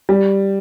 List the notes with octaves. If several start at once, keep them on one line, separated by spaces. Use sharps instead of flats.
G3